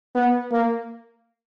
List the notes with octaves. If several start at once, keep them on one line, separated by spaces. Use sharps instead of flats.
B3
A#3